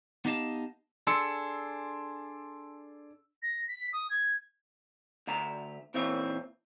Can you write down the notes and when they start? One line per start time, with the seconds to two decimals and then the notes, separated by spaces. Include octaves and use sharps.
0.25 B3 D#4 G4 D#5 F5 A5
1.07 D4 G#4 A4 C6 E6 C#7
3.42 A#6
3.68 B6
3.93 D#6
4.10 G#6
5.27 D2 E5 A#5
5.94 A#2 E3 C4 C#5 E5